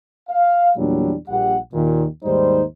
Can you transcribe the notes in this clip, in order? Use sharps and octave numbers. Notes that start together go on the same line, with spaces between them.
F5
E2 A#2 F#3 G3 D4
A#1 G3 F#5
D#2 A#2 D#3
D#2 G#2 G3 D#4 C5